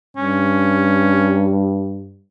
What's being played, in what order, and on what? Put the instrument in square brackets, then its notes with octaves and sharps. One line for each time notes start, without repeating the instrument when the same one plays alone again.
[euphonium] G2 [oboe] C#4